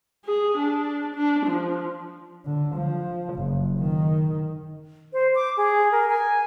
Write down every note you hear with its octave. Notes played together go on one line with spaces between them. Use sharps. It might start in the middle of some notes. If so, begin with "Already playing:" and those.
G#4
D4
D4
F3
D3
F3
F#1
D#3
C5
D6
G#4
A#4
G#5